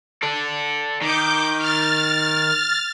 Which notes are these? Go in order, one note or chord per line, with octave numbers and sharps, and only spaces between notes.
A4 D5
D#3 D6 G6
F6 A6